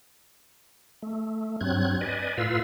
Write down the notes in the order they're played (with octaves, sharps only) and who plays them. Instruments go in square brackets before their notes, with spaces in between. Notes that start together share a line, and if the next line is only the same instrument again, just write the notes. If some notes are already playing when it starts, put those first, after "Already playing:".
[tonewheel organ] A3
G2 F#3 C4 F#6 G#6
B4 D5 D#5 G#5
A2 F4 B4 F5 E6